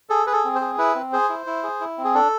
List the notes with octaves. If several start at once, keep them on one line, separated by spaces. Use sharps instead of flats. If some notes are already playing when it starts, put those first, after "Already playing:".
G#4 A4
G#4 B4
A4
C4
C5
G#4
E4 B4
C4
G#4 C5
E4
E4
G#4
E4
C4
G#4
D4 A4